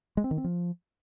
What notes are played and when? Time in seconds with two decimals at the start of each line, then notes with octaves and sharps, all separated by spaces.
0.17 G#3
0.24 C4
0.31 D#3
0.38 C4
0.44 F3